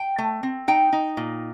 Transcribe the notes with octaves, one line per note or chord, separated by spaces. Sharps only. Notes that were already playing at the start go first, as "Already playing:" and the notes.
Already playing: G5
A3
C4
D#4 G5
D#4
A#2